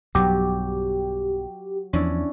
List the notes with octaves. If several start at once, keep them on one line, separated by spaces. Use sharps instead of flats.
B1 G2 F#3 G4
E2 F3 C#4 D4 E4